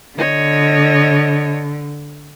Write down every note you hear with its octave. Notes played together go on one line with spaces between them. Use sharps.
D3 C#5 D#5